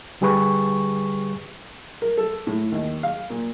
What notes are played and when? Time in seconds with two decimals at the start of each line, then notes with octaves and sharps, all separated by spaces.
0.21 D3 G3 G4 G#4 B4 C#6
2.02 A#4
2.17 A4
2.47 A2
2.72 D#2
3.03 F5
3.30 A#2